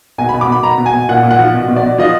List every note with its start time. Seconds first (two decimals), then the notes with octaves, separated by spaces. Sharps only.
0.18 B2 G#5
0.29 B2 B5
0.41 D6
0.48 B2 B5
0.63 B2 A#5
0.78 B2
0.86 G#5
0.94 B2
1.09 A#2 F#5
1.23 A#2
1.31 F#5
1.39 F3
1.54 B2
1.68 B2
1.76 D5
1.83 B2
1.98 F3 D#5